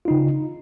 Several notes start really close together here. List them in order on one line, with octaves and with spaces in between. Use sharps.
F4 D#4 C#3